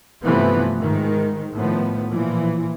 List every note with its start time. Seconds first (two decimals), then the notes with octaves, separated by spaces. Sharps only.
0.23 G2 C3 E3 F3 A3 B3
0.79 G#2 D#3 G#3
1.54 A2 D#3 F3 B3
2.11 A#2 E3 F3